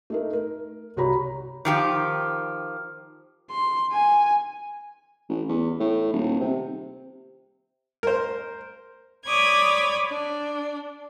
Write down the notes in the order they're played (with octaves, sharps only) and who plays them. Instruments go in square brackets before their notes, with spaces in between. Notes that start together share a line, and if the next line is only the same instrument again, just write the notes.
[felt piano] A3 D#4 A#4
A#4
C2 F#4 G4 C#5 A#5 B5
[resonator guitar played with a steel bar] D#3 F3 G4
[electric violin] C6
G#5
[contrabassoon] A1
E2
A2
D#1
C3
[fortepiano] A#4 C5
[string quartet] C#5 D5 B5 D6 D#6 G#6
D4